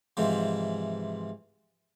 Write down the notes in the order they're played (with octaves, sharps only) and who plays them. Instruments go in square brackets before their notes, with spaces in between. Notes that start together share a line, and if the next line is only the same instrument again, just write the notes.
[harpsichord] G#2 C3 E3 F3